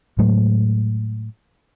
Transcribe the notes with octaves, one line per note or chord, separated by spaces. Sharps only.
A2 F#3 G#3 A3